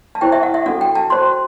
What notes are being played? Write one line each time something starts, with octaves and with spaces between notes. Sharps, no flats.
A5
E4 G4 C5 G5
E5
F#5
E5
D4 F#4 A4 F#5
G5
A5
F#4 C5 C6